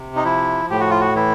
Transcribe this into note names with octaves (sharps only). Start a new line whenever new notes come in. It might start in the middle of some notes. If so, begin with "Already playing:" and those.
Already playing: C3
D#4
F3 E4
A2 G4
F#4
F4
F#4
E3 E4